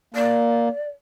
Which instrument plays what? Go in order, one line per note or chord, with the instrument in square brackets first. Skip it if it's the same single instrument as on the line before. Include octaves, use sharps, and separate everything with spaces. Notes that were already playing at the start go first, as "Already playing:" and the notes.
[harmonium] A#3 [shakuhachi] D5